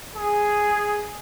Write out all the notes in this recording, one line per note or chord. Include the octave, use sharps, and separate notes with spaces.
G#4